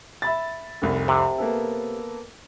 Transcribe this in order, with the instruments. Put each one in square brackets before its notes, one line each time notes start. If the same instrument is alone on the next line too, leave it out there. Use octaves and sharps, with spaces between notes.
[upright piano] E5 B5 A6
F1 C2
[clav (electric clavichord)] C3
[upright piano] A#3 B3 A4